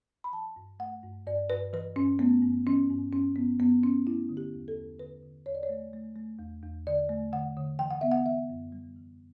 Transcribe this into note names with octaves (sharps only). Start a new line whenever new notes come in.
B5
E3 A5
G2
A3 F#5
G2
G2 D5
G2 B4
E3 B4
G2 C#4
A3 B3
G2
E3 C#4
G2
G2 C#4
G2 B3
G2 B3
E3 C#4
A3 E4
D3
G4
E2
A4
E2
D3 B4
D3
E2 C#5
D5
C#5
A3
A3
A3
E2
E2
D3 D5
A3
D3 F#5
D3
E3 G5
F#5
B3 E5
F#5
E3 E5
F#2
G3
E3